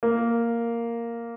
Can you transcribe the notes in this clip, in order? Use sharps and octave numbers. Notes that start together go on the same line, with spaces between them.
A#3